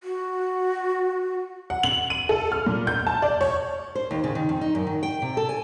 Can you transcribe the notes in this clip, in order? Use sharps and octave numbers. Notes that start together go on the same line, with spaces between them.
F#4
F#5
F#7
D#7
A4
F6
A#2
G6
A5
D5
C#5
C5
D#2
C#3
D#3
F2
D#4
F#2
D#3
G5
C3
A4
G#5